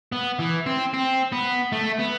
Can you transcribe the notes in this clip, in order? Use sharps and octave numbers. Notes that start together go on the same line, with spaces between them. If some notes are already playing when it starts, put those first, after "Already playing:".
B3
E3
C4
C4
B3
A3
B3